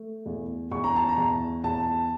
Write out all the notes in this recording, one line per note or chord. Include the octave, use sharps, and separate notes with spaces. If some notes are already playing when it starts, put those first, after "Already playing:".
Already playing: A3
E2
E2 C#6
A#5
A5
A#5
E2
E2 A5